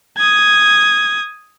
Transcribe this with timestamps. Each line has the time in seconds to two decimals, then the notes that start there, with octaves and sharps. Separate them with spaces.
0.17 D#6 G#6